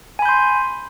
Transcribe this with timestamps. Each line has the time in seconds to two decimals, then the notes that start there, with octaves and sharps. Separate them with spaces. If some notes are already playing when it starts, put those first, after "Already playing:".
0.19 G#5
0.22 B5
0.25 G6
0.29 C6